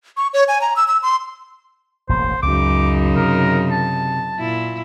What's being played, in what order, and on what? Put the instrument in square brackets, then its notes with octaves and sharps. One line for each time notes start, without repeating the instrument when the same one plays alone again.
[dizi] C#6
C#5
G#5
A#5
E6
E6
C6
[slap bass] E1 A1 A#3 [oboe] C5
[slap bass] C#2 [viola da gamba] F#2 C#3 D#4 [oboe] D6
[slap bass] C3 [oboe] A#4
[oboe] A5
[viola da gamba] A#2 E4